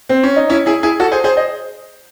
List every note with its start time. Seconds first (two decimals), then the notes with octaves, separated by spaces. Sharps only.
0.09 C4
0.23 C#4
0.36 D#4
0.50 C#4 E4
0.66 E4 G#4
0.83 E4 G#4
1.00 F#4 A4
1.12 G#4 C5
1.24 G#4 C5
1.37 C5 D#5